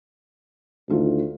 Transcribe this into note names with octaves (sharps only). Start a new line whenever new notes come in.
D2 D#3 F4 A4